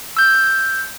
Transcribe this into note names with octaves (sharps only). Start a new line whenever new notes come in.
E6 G6